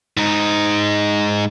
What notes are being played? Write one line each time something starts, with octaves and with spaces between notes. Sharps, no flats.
G#2 D#4